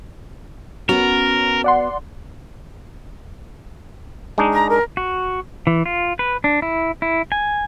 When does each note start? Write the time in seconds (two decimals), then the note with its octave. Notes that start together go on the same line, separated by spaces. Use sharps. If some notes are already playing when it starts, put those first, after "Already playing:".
0.89 B3 C#4 F#4 A#4
1.64 D5 F#5 C6
4.38 G#3 D4 D#4
4.53 A#5
4.69 A#4
4.97 F#4
5.67 E3
5.86 F4
6.19 B4
6.44 D4
6.62 E4
7.02 E4
7.32 G#5